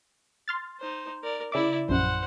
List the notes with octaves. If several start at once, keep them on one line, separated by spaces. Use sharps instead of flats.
C6 F6 A6
D#4 C5
A#4 D5
C#3 E4 D5 E5 D6
A#1 F#2 C5 F#5